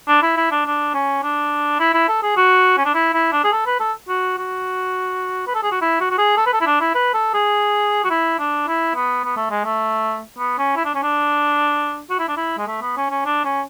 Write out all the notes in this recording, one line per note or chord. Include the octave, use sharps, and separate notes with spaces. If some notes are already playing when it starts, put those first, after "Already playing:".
D4
E4
E4
D4
D4
C#4
D4
E4
E4
A4
G#4
F#4
C#4
D4
E4
E4
D4
G#4
A4
B4
A4
F#4
F#4
B4
A4
G#4
F#4
E4
F#4
F#4
G#4
A4
B4
A4
E4
D4
E4
B4
A4
G#4
F#4
E4
D4
E4
B3
B3
A3
G#3
A3
B3
C#4
E4
D4
C#4
D4
F#4
E4
D4
E4
G#3
A3
B3
C#4
C#4
D4
C#4